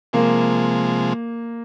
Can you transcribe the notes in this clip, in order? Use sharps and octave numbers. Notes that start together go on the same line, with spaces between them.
C3 F3 G#3 A#3